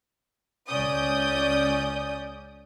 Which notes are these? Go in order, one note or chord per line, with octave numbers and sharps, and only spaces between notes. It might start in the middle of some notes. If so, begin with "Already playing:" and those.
C#2 C#4 D5 D#6 G6